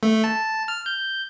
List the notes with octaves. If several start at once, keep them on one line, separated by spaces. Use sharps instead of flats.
A3
A5
F6
G6